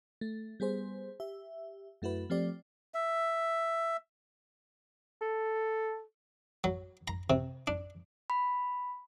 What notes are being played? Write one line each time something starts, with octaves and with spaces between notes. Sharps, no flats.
A3
G3 B3 G#4 C5
G4 E5
F#2 A3 E4 F#4 B4
F3 A3 C4 G4 D5
E5
A4
F#3
A#5
C3
D4
B5